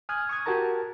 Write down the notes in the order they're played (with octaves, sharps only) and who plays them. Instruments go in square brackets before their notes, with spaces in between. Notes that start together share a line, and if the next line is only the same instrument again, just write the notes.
[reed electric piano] G#5 D#6 F6 F#6 G#6
C#6 D#6 G#6
F#4 G4 A#4 A5 A#5